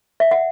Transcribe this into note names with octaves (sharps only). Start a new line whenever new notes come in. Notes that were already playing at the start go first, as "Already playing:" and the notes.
E5
F#5